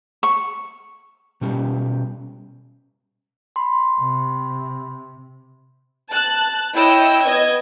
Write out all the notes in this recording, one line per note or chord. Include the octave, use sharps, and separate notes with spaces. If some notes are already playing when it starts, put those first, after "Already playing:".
C#6
B2 G3 C#4 G4
B5 C6
C3
A5 F#6
E4 C#5 D#5 G5 E6
B3 D#5 G#6